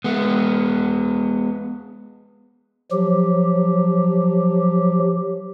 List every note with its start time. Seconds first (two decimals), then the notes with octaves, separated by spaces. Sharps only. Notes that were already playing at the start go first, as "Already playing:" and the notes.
0.04 G#3 B3
2.92 F3 F#3 G4